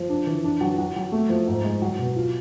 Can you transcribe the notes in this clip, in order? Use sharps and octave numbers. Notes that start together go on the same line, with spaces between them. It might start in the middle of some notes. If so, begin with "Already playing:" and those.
Already playing: F3
D4
E3
D4
F#3
F#3
F#3
A3
F3
G#2
G#3
F#3
B2
F4